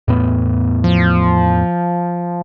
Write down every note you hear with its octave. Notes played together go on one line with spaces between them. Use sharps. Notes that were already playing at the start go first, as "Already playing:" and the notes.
E2 A2 B3
F3